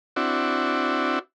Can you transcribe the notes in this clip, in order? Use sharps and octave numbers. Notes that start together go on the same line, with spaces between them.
C4 D4 E4 F#4